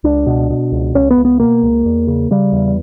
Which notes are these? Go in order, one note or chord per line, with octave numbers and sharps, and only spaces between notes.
C#2 D4
B2
B2
C#2
C#2 C#4
B3
C#2
B3
B2 A#3
C#2
E2
C#3
C#3 G3
E2